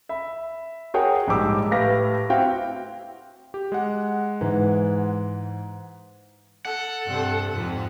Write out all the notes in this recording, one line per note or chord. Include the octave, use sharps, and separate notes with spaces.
E5 B5
F#4 G#4 A#4 C#5 F#5 G5
A#1 G#2 G3 G4 D6 E6
A2 G4 B4 F5 A#6
C4 E4 F#4 F5 G5
G4
G#3 F#5
G#2 E3
A4 F#5
G2 C3
F2 G#2